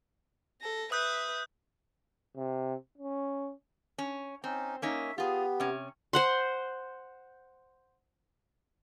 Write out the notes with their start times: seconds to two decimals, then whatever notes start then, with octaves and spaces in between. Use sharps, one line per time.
0.61 A4 A#6
0.92 B4 E5 D#6 F#6 G6
2.36 C3
2.98 C#4
3.98 C#4
4.44 C4 C#4 D#4
4.82 A#3 C#4 D#4 E5
5.18 B3 F4 G4 G#4
5.60 C3 C#4
6.13 C5 F#5 C6